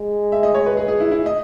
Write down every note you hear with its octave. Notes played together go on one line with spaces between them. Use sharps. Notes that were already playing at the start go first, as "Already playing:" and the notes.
Already playing: G#3
E5
D#5
C#5
B4
G#4
G#4
E4
E4
D#5